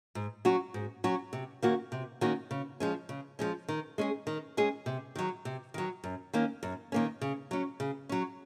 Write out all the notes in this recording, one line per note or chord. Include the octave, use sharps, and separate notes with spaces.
G#2
F#3 C#4 F#4
G#2
F#3 C#4 F#4
C3
D#3 A#3 C#4 F#4
C3
D#3 A#3 C#4 F#4
C#3
F3 G#3 C#4
C#3
F3 G#3 C#4
D#3
G#3 C#4 G#4
D#3
G#3 C#4 G#4
C3
D#3 F#3
C3
D#3 F#3
F#2
D#3 A#3 C#4
F#2
D#3 A#3 C#4
C#3
F#3 C#4
C#3
F#3 C#4